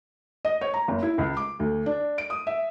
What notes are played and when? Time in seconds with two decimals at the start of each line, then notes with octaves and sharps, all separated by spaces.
0.45 D#5
0.61 C#5
0.74 A#5
0.88 F#1
1.03 E4
1.18 C#2
1.37 D6
1.59 D2
1.86 D4
2.18 D7
2.30 D#6
2.47 E5